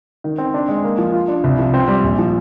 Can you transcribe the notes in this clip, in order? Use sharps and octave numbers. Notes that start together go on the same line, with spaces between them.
D#3
C4
D4
G#3
A#3
F3
F4
D4
C2
F3
C4
G3
A#1
F3